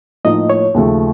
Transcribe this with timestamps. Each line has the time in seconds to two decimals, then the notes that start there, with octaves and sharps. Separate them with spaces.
0.25 A2 F3 A#3 D#4 D#5
0.50 C#5
0.74 D#2 C#3 F3 A3